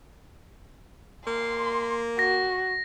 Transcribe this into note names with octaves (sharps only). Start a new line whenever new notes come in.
A#3 C6
F#4 A#6